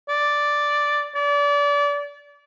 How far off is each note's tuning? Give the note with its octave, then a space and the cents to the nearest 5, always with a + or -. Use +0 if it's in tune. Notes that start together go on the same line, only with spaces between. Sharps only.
D5 +0
D5 -30